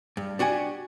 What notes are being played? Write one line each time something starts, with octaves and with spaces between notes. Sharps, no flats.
G2
D4 F#4 G4 G#5